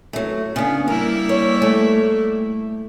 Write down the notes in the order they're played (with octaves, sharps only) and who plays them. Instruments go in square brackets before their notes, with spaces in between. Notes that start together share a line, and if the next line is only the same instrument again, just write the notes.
[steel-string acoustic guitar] F#3 A3
[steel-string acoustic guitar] C#3 D4 [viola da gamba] B3
[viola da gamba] G3 A#3 E4 [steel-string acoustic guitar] A#4
[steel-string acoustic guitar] C#5
A3